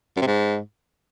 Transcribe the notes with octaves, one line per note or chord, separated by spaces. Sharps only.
F#2
C3
G#2